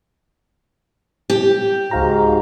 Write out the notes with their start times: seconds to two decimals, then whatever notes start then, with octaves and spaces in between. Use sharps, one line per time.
1.30 G4
1.91 C#2 G#2 F#4 F5 A#5